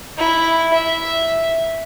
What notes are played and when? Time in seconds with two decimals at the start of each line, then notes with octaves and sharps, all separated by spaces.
0.18 E4
0.74 E5